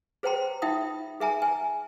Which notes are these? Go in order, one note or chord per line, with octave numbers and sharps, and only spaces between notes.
G#4 C5 C#5 G5 A#5 C6
D#4 F4 E5 G5 D#6
G#4 E5 G#5 A#5
G#5